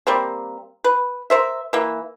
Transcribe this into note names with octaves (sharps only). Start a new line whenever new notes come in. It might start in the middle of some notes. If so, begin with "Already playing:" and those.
G3 A#3 C4
B4
A#4 C5 E5
E3 A#3